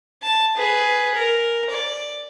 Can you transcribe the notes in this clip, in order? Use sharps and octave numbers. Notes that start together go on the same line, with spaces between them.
A5
G#4 B4
A#4
D5